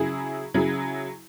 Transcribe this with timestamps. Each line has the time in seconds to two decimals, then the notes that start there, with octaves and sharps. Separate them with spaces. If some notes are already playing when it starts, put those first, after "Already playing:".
Already playing: C#3 F#3 E4 G#4
0.54 C#3 F#3 E4 G#4